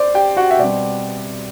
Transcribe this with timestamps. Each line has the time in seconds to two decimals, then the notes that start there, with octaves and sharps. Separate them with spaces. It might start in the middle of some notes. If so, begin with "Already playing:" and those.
Already playing: C5 D5
0.14 G4 G5
0.36 F#4 F#5
0.51 E5
0.59 B2 G3 C4 D5